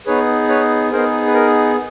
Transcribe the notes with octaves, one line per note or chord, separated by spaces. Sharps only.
B3 D#4 G#4 B4 C#5
B4 C#5
B3 D#4 G#4 A#4 C5
B4
A#4